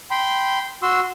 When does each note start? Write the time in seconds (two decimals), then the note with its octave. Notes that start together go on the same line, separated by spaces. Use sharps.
0.11 G5 B5 C6
0.82 F#4 C6 E6